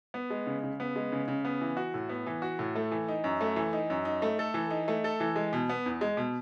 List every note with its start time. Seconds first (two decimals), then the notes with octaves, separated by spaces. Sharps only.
0.14 B3
0.30 G#3
0.47 C#3
0.63 C#3
0.80 B3
0.96 G#3
1.12 C#3
1.28 C#3
1.45 B3
1.61 E3
1.77 F#4
1.94 A2
2.09 B3
2.27 E3
2.42 F#4
2.59 A2
2.76 A3
2.92 E3
3.08 D#4
3.24 F#2
3.41 A3
3.56 E3
3.73 D#4
3.90 F#2
4.05 D#4
4.22 A3
4.39 A4
4.54 E3
4.71 D#4
4.88 A3
5.04 A4
5.20 E3
5.36 G#3
5.53 B2
5.69 B3
5.86 E2
6.01 G#3
6.17 B2